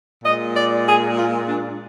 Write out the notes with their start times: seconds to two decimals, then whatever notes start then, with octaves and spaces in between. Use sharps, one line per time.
0.24 A#2 G#3 D#5
0.55 D5
0.86 G#4
1.17 F4
1.47 D4